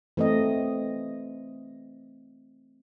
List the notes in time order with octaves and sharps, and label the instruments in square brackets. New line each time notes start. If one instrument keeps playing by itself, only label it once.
[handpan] E3 A3 C4 D#5